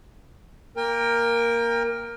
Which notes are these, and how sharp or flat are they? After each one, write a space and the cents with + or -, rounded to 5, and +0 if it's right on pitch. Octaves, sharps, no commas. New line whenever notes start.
A#3 +0 A#4 +5 G5 +35